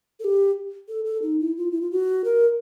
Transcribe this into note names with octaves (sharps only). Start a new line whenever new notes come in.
A4
G4
A4
A4
D#4
E4
F4
E4
F4
F#4
A#4